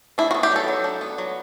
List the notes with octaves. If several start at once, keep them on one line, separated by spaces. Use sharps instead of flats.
D4 E4
F#4
B3
G4
F#3 A4
F#3
D4
B3
F#3